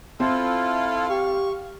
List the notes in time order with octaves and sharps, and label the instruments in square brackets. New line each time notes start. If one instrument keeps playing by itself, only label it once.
[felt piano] C4 [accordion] E4 F4 A4 [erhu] F5
[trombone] G4 [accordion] C#6